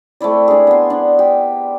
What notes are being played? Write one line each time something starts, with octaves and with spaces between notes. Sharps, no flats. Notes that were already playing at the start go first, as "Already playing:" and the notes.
A3 C4 E4 D5
D4 G#4
B3 C6
D4
G4